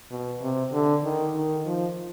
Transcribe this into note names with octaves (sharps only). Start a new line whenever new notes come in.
B2
C3
D3
D#3
D#3
F3